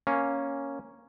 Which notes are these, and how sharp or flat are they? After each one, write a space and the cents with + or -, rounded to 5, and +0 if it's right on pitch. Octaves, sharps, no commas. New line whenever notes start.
A#3 +0 C#4 +0